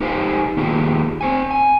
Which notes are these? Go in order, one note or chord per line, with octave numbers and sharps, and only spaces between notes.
D#4 G4 B4 C5 F5 G#5
D#3 A#3 E4 F4 G4 G#4
C4 C5 G#5
G#5